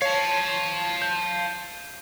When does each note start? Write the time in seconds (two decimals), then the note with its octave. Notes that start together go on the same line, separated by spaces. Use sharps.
0.02 C#5 F5 A5
1.02 G6